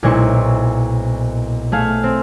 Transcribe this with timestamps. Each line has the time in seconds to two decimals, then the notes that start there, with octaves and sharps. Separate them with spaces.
0.03 B1 A#2 G#3 E4 C5 C#6
1.72 A3 G#4 F5
2.04 C4